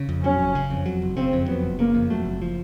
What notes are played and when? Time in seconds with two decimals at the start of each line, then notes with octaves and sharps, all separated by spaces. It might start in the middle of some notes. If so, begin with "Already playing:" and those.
Already playing: C#3
0.09 F2
0.24 F#3 C#4
0.39 F#1
0.55 C#3
0.70 F2
0.86 F#3
1.02 F#1
1.16 C#3 C4
1.33 F2
1.48 F#3 B3
1.63 F#1
1.79 C#3 A#3
1.95 F2
2.10 F#3 A3
2.25 F#1
2.42 F3